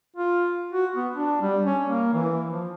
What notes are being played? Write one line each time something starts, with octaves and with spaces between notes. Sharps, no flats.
F4
F#4
B3
D4
G3
C#4
A#3
E3
F3